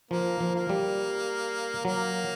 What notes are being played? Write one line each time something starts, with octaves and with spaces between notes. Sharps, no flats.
F3 A#3
F3
A#3
G3
F#3 A#3